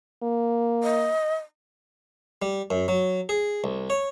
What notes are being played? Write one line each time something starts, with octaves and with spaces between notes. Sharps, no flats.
A#3
D#5
G3
F#2
F#3
G#4
C2
C#5